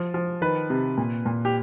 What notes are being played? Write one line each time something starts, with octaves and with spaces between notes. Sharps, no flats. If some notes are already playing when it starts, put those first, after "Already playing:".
Already playing: F3
F3
D#3 B4
C3
A#2
A#2
G4